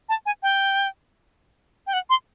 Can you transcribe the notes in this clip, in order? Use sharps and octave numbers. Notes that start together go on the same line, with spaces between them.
A5
G#5
G5
G5
F#5
C6